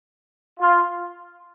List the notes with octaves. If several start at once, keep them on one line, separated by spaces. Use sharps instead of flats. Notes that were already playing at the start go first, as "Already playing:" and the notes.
F4